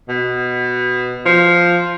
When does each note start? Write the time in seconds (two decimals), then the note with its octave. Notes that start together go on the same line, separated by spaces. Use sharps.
0.09 B2
1.26 F3